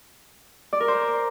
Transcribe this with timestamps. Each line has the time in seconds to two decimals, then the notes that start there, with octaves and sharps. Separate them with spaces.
0.73 D5
0.80 A#4
0.88 C5